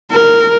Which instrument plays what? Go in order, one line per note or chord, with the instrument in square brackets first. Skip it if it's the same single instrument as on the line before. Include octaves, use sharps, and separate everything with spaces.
[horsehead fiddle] A#4